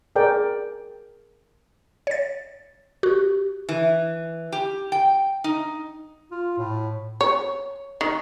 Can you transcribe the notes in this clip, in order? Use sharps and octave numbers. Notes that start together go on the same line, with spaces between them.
G#4 A#4 D5 G5
C#5 A6
F#4 G4
E3
G4
G5
D#4
F4
A2
C#5
D#3